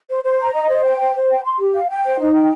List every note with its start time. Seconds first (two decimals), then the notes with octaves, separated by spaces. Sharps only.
0.09 C5
0.24 C5
0.40 A#5
0.54 D#5
0.68 C5
0.84 G5
0.99 C5
1.15 C5
1.30 G5
1.44 C6
1.59 G4
1.75 F5
1.90 G5
2.05 C5
2.19 D#4
2.35 G5